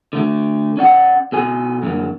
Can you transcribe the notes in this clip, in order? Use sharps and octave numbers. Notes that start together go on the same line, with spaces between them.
D3 A3
C#4 D5 F#5
B2 A4 G#5
F#2 D3 A#3